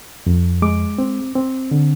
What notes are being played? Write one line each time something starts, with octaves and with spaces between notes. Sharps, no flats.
F2
G#3 D6
C4
C4
D3